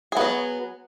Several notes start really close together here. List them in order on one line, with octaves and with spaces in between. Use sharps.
G#4 B3 F#3